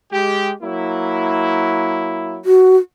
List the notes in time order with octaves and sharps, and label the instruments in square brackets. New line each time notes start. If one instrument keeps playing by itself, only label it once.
[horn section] G#3 G4
F#3 A#3 E4
[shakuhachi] F#4